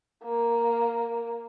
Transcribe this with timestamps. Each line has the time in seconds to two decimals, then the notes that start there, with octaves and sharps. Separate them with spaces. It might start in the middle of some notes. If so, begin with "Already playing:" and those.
0.24 A#3